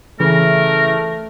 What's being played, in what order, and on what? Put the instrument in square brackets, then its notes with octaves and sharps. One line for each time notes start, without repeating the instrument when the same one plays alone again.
[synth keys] C#3 E3 [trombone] A3 [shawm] A#4